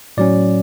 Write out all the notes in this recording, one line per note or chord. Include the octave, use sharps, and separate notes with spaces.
A2 F#3 C#4 D5